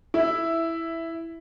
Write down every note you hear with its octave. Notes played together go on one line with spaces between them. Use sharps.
E4